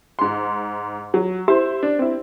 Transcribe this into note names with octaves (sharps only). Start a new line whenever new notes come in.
G#2 C6
F#3
E4 G4 C5
D4
C4 E4